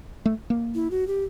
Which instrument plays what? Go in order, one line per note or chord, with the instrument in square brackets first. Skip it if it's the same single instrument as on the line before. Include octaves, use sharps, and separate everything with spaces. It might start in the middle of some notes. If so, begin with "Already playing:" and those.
[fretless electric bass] A3
A#3
[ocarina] E4
F#4
G4